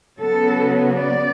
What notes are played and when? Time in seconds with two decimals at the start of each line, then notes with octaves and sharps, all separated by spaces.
0.18 C#3 F#3 B3 A4
0.97 D5